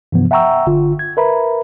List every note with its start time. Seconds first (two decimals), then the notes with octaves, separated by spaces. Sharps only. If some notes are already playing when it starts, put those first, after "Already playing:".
0.12 G2 C3 E3 F3 B3
0.31 E5 F#5 G5 A#5 C#6 E6
0.66 G1 D3 F4
0.99 G#6
1.17 A#4 B4 E5 A#5 B5